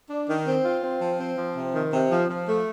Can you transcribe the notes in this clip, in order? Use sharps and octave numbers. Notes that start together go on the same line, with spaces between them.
D4
D#3
C4
F4
C4
F3
C4
F3
C3
D#3
C3
F3
F3
A3